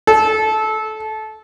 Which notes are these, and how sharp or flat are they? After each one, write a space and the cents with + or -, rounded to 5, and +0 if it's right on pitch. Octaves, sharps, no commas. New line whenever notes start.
A4 -20